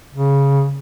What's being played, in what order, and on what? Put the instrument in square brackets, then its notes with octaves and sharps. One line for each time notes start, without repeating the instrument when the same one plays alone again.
[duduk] C#3